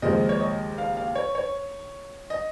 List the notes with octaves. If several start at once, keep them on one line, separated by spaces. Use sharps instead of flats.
D#2 C#3 F3 G#3 D#5
C#5
D#5
F5
F5
C#5
C#5
D#5